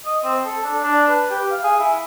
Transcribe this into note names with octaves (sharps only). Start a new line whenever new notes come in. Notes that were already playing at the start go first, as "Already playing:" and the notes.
D#5
C4
A4
D4
D4
B4
G4
F5
G#4
E4